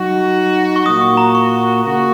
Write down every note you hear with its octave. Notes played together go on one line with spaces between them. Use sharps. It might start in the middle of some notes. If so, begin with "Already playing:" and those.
Already playing: F#3 D#4 F#4
C#6
A#2 A#3 F#4 D#6
C#6
A#5
C#6
C#3 A#3 F#4